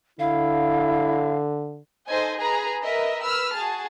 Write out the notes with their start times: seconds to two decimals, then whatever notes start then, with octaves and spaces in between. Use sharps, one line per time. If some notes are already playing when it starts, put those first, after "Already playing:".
0.19 D3 E4 F5
2.10 D#4 A4 C5 D#5 G#5
2.39 G#4 B4 A#5
2.83 A#4 B4 D#5 E5
3.21 B4 E6 F6
3.54 F#4 G#4 A5